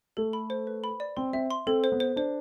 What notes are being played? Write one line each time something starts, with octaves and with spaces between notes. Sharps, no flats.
A3 A4
B5
C5
B4
B5
D5
C4 C6
C4 E5
C6
C4 A4
C5
B3
C5
D4 C5